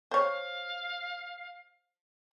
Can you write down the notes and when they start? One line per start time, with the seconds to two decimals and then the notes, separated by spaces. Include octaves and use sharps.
0.11 C5 C#5 F5